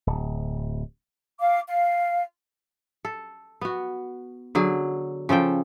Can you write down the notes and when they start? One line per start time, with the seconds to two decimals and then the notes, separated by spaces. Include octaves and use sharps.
0.07 D1
1.39 F5 D6
1.67 F5
3.05 A4
3.61 B3 F#4
4.55 D3 F#3 G#4
5.29 C#3 F3 A4 G5